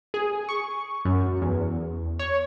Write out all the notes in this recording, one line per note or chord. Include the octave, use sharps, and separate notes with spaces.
G#4
C#6
F#2
E2
C#5